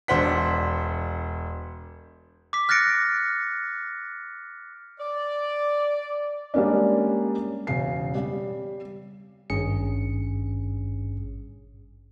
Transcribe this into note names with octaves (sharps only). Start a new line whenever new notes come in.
E1 D4 C5 F#5 B6
D6 B6
F6 F#6 A6 A#6 C#7 D7
D5
G3 G#3 A#3 C#4 D4
E1 C#3 C7
G3
G#1 G2 C#4 G#4 C#7